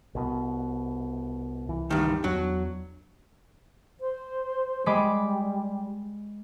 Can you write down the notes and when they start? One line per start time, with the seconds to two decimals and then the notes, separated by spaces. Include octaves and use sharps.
0.15 C2 B2
1.68 C2 E3
1.90 G2 D#3
2.24 E2 F#3 D4
4.01 C5
4.86 G3 G#3 B5 D6